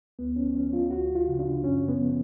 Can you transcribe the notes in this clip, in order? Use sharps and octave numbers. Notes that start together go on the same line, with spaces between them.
D2 B3
C#4
F3 C#4
F4
D2 F#4
F4
C#3
D4
F#2 C#4
B3
F3